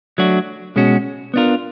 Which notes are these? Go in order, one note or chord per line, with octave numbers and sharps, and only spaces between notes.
F#3 A3 D4 F#4
B2 G#3 C#4 F#4
B3 D4 F4 A#4